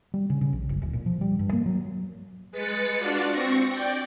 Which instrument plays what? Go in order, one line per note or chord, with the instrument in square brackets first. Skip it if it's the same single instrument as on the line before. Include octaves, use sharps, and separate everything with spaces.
[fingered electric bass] G3
C#3
C#3
A#1
F#1
D1
A#2
F3
G3
G2
A#3
F#3
[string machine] G#3 B4 B5 A6 B6 C#7
D4 F4 F#4 D5
C4 C#6 A#6
D5 G5